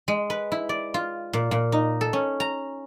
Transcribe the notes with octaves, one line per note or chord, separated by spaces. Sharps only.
G#3
B4
E4
D5
F4
A#2
A#2
D#4
A4
C#4
A#5